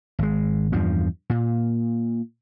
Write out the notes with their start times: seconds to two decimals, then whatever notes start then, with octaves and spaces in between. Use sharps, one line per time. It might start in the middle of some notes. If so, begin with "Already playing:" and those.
0.19 G#1 G#3
0.73 E2 G2 F3
1.30 A#2